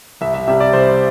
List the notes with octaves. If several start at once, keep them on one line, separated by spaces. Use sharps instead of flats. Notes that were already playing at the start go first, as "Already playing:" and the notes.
C2 E5
E5
C3 G3 E5
D5
C2 C5